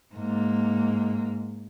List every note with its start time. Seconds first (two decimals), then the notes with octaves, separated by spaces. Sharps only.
0.15 G#2 A#3